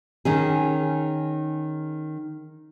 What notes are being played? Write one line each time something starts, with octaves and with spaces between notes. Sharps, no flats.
D#3 C#4 G#4